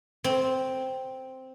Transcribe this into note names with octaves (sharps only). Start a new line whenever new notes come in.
C4